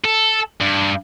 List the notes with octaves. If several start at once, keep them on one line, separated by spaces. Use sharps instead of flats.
A4
G2